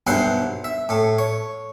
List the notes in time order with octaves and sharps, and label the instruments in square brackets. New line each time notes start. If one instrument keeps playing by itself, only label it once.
[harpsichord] B1 G2 E4 C5 F#5
E5
A2 A3
C#5